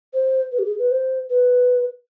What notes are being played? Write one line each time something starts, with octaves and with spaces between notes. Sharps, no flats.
C5
B4
G4
G#4
B4
C5
B4